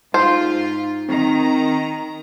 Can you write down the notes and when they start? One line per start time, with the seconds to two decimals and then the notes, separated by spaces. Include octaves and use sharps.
0.14 G#2 D#4 F4 C5
1.09 D#3 C4 A#5